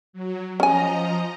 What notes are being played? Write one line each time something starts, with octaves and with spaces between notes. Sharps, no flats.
F#3
F3 C#4 D#5 G#5 A#5